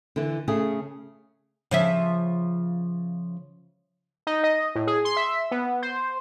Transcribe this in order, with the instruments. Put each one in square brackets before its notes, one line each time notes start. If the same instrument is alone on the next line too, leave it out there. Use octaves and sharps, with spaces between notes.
[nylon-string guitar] D3 E3
C#3 A3 G#4
[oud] C#3 F3 E5
[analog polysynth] D#4
D#5
A2
G#4
C6
E5
B3
C5